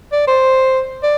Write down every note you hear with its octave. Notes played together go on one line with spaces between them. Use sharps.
D5
C5
D5